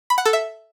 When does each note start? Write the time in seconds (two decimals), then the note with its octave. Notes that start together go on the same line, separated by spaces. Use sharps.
0.10 B5
0.18 F#5
0.25 A4
0.33 E5